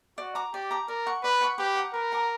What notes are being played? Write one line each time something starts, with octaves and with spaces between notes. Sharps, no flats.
F#4 D5
A#5 D6
G4 D5
A#5 D6
A#4 D5
F#5 C#6
B4 D5
F#5 C#6
G4 B4
F#5 A#5 D6
A#4 B4
F#5 A#5 D6